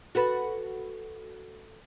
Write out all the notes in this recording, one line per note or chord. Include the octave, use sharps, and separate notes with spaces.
F#4 A4 B4